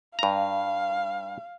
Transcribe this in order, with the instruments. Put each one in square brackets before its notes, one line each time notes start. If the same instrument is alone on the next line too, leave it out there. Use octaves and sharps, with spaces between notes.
[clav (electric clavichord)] G2 A#5 [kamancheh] F5